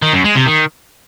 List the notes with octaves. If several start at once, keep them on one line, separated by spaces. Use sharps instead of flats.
D#3
F#2
G#3
C3
D#3